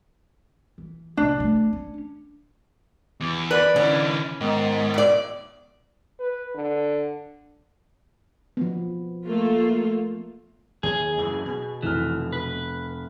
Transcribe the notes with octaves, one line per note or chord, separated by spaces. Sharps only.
E3
D1 C3 D4
A3
C#4
E2
B3 B4 D5
D3 E3 C#4
G#2 D#3 B3
B2 D5
B4
D3
F3 B3
A3 A#3 F4
D#2 G#4
F#2 C#3 E3
B2
F1 E3 F6
B4